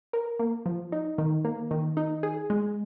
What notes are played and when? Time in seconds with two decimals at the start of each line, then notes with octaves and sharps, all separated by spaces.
0.13 A#4
0.39 A#3
0.66 F3
0.92 D#4
1.18 D#3
1.45 A#3
1.71 D#3
1.97 D#4
2.23 G#4
2.50 G#3